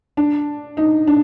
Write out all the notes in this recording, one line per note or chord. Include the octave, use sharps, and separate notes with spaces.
D4
D#4
D4